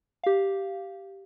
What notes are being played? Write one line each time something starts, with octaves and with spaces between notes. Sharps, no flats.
G4 F5